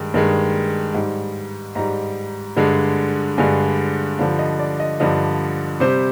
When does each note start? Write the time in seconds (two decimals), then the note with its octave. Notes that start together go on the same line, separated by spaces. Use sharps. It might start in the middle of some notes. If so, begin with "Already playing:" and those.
Already playing: G2 D#3 G#3
0.14 G2 D#3 G#3
0.94 G#2 G3
1.75 G#2 G3 A#5
2.57 G2 D3 G#3
3.38 G2 D3 G#3 G#5
4.19 G2 D3 F3 F5
4.39 D#5
4.59 D5
4.80 D#5
5.00 G2 D3 F3 D#5
5.80 C3 G3 C5